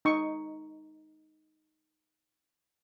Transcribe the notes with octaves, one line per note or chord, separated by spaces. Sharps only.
D#4 C#6